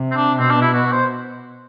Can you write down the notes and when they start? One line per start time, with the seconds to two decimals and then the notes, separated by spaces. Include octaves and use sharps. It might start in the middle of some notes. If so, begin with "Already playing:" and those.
Already playing: C3
0.11 C4
0.16 D4
0.39 B2 C4
0.50 D4
0.62 E4
0.74 F#4
0.92 C5